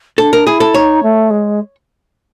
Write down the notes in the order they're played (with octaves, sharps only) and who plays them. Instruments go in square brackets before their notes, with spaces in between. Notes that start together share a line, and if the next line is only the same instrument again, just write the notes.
[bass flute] D4 [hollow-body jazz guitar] A4
[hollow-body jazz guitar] A#4
[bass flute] E4 [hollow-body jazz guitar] G#4
[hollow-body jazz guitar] A4
[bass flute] D#4 [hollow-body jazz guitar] C#5
[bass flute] A3
G#3